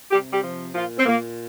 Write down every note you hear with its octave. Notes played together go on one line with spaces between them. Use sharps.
C3 G3 G4
G3 G4
F3
A#2 F3 F4
C4
A#2 A#3